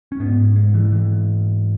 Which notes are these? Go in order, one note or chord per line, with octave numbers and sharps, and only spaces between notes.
C#4
G#2 B3
G#3
E3
E3